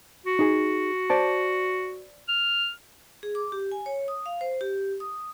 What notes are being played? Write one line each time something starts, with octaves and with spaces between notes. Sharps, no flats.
F#4
D#4 G#4
C5 D5 A5
F6
G#4
D6
G4
G#5
C#5
D#6
F5
C5
G4
D#6